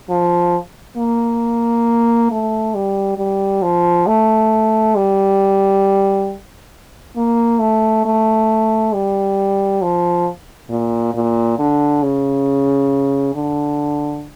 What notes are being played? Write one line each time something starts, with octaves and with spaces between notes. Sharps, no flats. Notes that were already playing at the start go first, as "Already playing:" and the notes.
F3
A#3
A3
G3
G3
F3
A3
G3
A#3
A3
A3
G3
F3
A#2
A#2
D3
C#3
D3